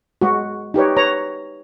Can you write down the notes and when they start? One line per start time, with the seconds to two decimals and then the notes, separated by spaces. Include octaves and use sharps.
0.21 G#3 F#4
0.74 D#4 G4 B4 C#5
0.96 B4 C#5 A#5